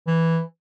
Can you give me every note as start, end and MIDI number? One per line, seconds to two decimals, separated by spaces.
0.07 0.41 52